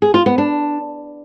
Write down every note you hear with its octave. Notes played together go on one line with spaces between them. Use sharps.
G#4
F4
B3
D4